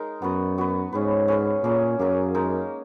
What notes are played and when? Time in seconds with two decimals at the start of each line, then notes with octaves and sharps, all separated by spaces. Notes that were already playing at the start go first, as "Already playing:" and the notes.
Already playing: G#3 D#4 A#4
0.22 F#2 B3 F#4 B4
0.58 B3 F#4 B4
0.92 G#2 C#4 G#4 B4
1.28 C#4 G#4 B4
1.64 A#2 A#3 C#4 G#4
1.99 F#2 A#3 C#4 G#4
2.35 G#3 D#4 A#4